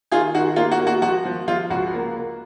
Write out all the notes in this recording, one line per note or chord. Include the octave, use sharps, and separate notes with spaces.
D#3 F4 G#4
D#3 F#4
A#3 F4
F#4
A#3
F#4
F3 F#4
F3
F3 F4
C#2 F#4
A#3
A#3